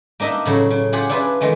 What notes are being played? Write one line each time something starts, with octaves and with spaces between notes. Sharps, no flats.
A#3 D4 D#4 D#5 E5
A2 C#3 F#3
C#3
F4 G4 G#4 F#5
D4 E4 F4 G#4 B4
D#3 E3 G#3 A3